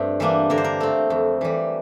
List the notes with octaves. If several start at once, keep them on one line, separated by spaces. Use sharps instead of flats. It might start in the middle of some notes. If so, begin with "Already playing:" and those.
Already playing: G2 A3 C4 C5
E3 G3 A#3 D4
D3 A#4
C5
A#4
A3 C4
F2
E3 G3